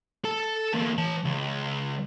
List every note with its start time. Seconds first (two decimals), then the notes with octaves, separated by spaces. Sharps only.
0.24 A4 A5
0.74 E2 A#3
0.98 E3 A5
1.25 C#2